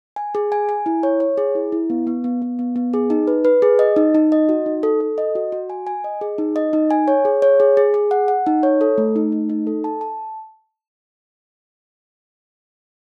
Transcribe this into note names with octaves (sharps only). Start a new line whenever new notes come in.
G#5
G#4
G#5
G#5
E4
C#5
C#5
G#4
E4
E4
B3
B3
B3
B3
B3
B3
G#4
D#4
B4
B4
G#4
D#5
D#4
D#4
D#5
F#4
D#4
A4
A4
D#5
F#4
F#4
G#5
G#5
D#5
G#4
D#4
D#5
D#4
G#5
C#5
G#4
C#5
G#4
G#4
G#4
F#5
F#5
D#4
C#5
A4
A3
D#4
A3
D#4
A4
A5
A5